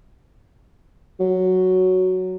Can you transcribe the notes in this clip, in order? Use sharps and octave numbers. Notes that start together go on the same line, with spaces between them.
F#3